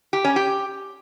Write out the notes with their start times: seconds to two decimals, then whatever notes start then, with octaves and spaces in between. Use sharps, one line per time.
0.13 G4
0.25 C#4
0.36 G4